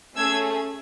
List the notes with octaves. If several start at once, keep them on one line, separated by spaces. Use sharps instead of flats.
A3 C#4 G#4 E6 G#6